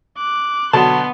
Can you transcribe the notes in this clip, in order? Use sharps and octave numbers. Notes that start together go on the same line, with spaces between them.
D6 F#6
B2 D3 F#3 B3 A5 C6